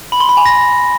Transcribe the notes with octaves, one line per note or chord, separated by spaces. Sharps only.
B5
C6
B5
G#5
A#6